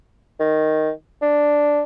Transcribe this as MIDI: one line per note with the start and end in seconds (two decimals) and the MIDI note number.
0.40 0.91 51
1.22 1.83 62